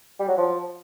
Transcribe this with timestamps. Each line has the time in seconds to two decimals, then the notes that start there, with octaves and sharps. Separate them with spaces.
0.20 G3
0.28 F#3
0.37 F3